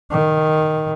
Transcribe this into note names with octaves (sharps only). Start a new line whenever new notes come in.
D#3